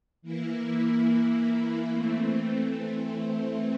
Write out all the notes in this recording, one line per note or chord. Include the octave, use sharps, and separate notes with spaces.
E3 A#3 E4
E3 A3 C4